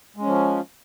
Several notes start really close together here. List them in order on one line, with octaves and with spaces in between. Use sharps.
G#3 C#4 F3